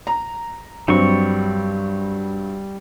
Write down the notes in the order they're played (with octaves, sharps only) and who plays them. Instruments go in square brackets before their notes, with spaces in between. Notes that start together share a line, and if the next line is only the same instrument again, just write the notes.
[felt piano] A#5
[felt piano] G2 F#3 C4 [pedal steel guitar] G3 C#6